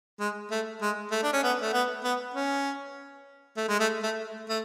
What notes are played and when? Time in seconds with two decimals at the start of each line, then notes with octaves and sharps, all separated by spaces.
0.20 G#3
0.51 A3
0.81 G#3
1.11 A3
1.23 D4
1.33 C#4
1.43 B3
1.61 A3
1.73 B3
2.04 B3
2.34 C#4
3.57 A3
3.68 G#3
3.80 A3
4.03 A3
4.49 A3